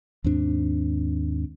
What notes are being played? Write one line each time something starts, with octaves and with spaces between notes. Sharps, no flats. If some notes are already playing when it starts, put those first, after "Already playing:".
D#2 G#2 C4 D4